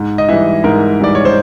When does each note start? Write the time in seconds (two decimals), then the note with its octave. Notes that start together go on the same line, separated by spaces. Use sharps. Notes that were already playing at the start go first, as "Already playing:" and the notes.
Already playing: G#2
0.18 D#5
0.29 E3 G3 E5
0.64 G#2 A#4
1.00 E3 G3 D5
1.15 C#5
1.25 C5